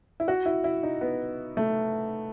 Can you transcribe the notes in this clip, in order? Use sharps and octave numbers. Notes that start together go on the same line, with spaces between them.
E4
F#4
E4
E4
D#4
B3
A3